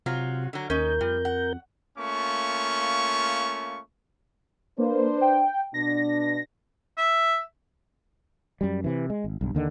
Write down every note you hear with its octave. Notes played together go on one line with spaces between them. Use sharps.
C3 F#3 F4
D3 F#3
D#2 C#4 A#4 D#5 G6
F2 G3
F#5
A3 A#3 C#4 F4 C#6
A#3 D4 B4 C5
G5
B2 D4 A#6
E5
F#2 G3
C3 E3
G#3
G#1
B1 G2
D#2 D3 D#3